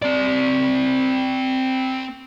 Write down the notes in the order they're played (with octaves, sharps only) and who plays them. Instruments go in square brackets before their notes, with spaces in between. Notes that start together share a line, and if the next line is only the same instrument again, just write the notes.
[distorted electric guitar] C4 D5